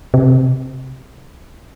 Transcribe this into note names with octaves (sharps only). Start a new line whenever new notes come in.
C3